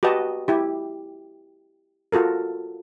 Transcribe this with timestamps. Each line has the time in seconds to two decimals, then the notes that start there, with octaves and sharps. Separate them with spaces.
0.03 F#4 G4 B4 D#5 A5
0.48 E4 G4
2.12 F4 F#4 A4 A#4